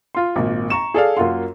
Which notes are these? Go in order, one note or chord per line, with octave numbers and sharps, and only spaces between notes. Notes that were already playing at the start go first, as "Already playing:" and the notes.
F4 C6
G#1 A#2
A#5 C#6 E7
G#4 A4 D5 F5
F#2 A#3 F4 F#4 C6